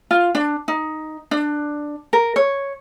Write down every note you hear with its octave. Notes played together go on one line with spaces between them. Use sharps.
F4
D4
D#4
D4
A#4
C#5